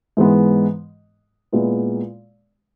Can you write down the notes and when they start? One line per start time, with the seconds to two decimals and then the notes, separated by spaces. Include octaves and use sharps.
0.17 G#2 E3 G#3 B3
1.52 A#2 G#3 B3 E4